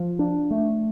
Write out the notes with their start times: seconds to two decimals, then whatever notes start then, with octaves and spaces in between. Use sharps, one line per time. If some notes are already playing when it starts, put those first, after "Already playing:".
Already playing: F3
0.19 D4
0.51 A3